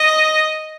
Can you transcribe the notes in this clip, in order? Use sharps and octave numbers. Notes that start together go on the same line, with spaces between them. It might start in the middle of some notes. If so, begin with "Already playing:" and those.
Already playing: D#5